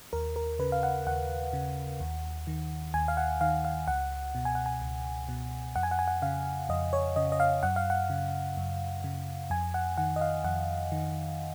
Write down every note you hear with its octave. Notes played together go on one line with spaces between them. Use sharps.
D#2 A#4
A#4
C#3 B4
F5
F#5
D#2 F#5
C#3
D#2
D#3
D#2 G#5
F5
F#5
D#3 F5
F5
C#2 F#5
B2
G#5
F#5
G#5
C#2
B2
F2 F#5
G#5
F#5
G#5
F#5
C#3 F5
F2 D#5
C#5
C#3 D#5
D#5
F5
F#2 F#5
F5
F#5
C#3
F#2
C#3
F2 G#5
F#5
D#3 F#5
D#5
F5
F2 F#5
D#3